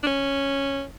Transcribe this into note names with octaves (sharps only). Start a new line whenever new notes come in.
D4
C#4